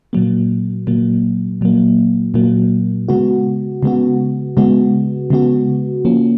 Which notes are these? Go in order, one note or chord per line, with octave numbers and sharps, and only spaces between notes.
A#2 F#3 A#3
A#2 F#3 A#3
A#2 F#3 A#3
A#2 F#3 A#3
C#3 G#3 B3 F#4
C#3 G#3 B3 F#4
C#3 G#3 B3 F#4
C#3 G#3 B3 F#4
F3 A#3 C#4